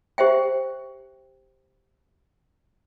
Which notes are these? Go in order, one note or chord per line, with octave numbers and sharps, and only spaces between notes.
G4 C5 E5 G5